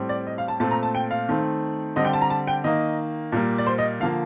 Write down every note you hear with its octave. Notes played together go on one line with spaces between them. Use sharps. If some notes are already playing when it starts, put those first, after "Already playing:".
Already playing: A2 G3 C4
D5
D#5
F5
A5
A#2 A3 C4 A5
A#5
A5
G5
F5
D#3 A3 C4
D3 G3 C4 D#5
G5
A5
A#5
A5
G5
D#3 A#3 D#5
A#2 G3 A#3
D5
C5
D#5
D3 F3 A#3 F5